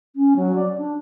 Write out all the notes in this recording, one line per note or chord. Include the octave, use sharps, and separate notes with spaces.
C#4
F#3
D5
D4